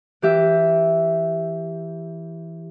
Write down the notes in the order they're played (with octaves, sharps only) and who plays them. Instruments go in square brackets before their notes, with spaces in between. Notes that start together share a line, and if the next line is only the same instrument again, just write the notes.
[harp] E3 G4 E5